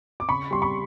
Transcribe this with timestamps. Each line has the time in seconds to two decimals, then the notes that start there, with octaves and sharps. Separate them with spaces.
0.20 D6
0.29 C#3 B5 C#6
0.51 G3 C6
0.62 B5 C#6